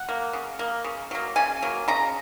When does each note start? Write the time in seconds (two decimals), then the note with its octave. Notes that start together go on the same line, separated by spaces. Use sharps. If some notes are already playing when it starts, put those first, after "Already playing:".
Already playing: F#5
0.09 A#3
0.33 C#3
0.59 A#3
0.84 C#3
1.11 F#3 A#3
1.36 C#3 G#5
1.62 F#3 A#3
1.88 C#3 A#5